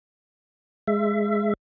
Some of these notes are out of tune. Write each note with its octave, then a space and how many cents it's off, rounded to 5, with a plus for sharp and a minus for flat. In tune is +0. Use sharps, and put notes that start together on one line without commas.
G#3 +0 E5 +25